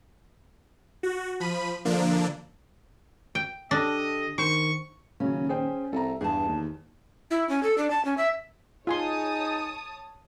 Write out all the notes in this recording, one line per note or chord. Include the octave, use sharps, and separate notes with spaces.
F#4
F3 B5 D#7
D3 F3 A#3 D4
G5
D3 D4 G4 A4 D#5
D#3 C5 C#6
D#1 C#3 F#3 C#4
G#4 C5 G5
C2 A4 E5 A#5
E2 G2 G#4 A5
D#2
E4
C#4
A4
D4
A5
C#4
E5
D#4 F4 G#4 C#5 G#5 A5 C6 D#6